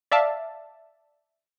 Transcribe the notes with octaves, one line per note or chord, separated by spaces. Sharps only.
D5 E5 F5 A5